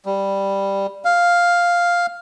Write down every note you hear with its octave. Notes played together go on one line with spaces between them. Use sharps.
G3
F5